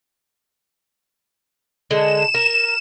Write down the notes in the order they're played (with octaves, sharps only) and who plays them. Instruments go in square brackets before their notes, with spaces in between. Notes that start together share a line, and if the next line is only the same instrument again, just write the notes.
[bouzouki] D3 G#3 [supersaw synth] E7
[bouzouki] A#4